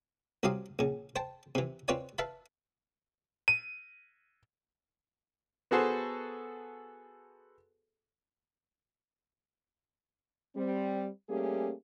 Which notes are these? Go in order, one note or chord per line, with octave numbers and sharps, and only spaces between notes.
C2 F#3 C4 G4 F5 D#6
A#1 C#3
C5 G5 A5
C3 E3
C4 F4 B4 C#5 D5 G#5
B4 E5 F5 A5 B5
D#7
B3 F#4 G#4 A4 C5
G3 C4
G3 A3 A#3 C#4 G4 G#4